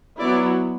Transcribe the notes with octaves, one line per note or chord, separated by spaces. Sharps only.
F#3 B3 E4 D5